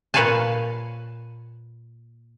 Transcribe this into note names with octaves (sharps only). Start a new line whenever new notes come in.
A#2 B4 C#5 F5 G#5 A5